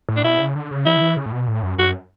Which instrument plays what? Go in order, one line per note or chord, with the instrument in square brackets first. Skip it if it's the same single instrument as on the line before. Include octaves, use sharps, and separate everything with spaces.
[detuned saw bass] A2
[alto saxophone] D4
[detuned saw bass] B2 [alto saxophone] E4
[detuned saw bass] C#3
D3
C#3
[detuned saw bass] E3 [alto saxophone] E4
[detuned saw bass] D3
E3
C#3
A2
B2
A2
F#2
[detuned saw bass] F#2 [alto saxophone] F#4